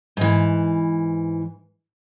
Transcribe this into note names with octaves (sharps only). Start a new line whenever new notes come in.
G#2 E3